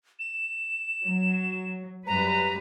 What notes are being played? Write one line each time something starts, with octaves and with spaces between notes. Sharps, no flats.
E7
F#3
F#2 G3 B4 A#5